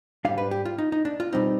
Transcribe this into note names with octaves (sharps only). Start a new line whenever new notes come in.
G#2 G3 D4 F5
B4
G4
F4
D#4
D#4
D4
F4
B2 G3 C4 D#4